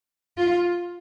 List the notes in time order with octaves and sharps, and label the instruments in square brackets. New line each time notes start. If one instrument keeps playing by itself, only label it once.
[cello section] F4